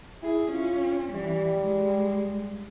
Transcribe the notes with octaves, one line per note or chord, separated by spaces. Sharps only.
E4 G#4
C#4 F4
E3 G3
G#3